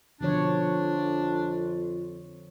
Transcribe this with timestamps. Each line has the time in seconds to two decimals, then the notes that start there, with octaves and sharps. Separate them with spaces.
0.21 B2 D3 F3 D4 F4 C#5
0.78 F2